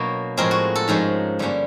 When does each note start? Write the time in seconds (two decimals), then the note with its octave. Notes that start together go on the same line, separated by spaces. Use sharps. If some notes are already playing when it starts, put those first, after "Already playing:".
Already playing: B2 F#3 A#3 D4
0.37 A2 F3 G#3 C4 A#4
0.51 F#4
0.75 A4
0.88 G#2 F3 G#3 C#4 A#4
1.39 G2 D3 G3 A#3 C#4